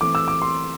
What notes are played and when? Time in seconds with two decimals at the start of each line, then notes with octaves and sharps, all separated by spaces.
0.01 E3 A3 C4 D6
0.15 E6
0.28 D6
0.42 C6